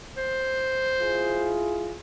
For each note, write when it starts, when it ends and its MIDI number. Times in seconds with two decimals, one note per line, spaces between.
0.17 1.56 72
0.99 1.99 64
0.99 1.99 65
0.99 1.99 68